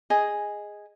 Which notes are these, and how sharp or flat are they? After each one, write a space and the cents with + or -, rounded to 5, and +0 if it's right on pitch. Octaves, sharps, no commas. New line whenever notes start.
G#4 -5 D#5 +0